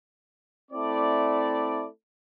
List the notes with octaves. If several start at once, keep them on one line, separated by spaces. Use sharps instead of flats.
A3 C4 E4 D5